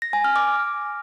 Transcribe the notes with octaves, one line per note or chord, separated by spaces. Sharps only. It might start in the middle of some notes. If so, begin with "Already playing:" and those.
A#6
G#5
F6
D6